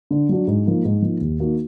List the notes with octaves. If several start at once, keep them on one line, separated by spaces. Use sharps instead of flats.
D3
F#3 D4 F#4
G#2
F3 A#3 D#4
G#2
F3 A#3 D#4
D#2
D#3 A#3 D#4 F#4